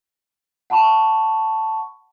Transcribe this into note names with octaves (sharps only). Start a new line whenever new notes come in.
F#5 A5 B5 C#6